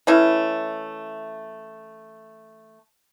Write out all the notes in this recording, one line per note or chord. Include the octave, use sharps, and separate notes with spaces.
E3 A3 C#4 E4